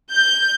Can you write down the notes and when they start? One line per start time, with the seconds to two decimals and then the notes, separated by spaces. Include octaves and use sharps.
0.13 G6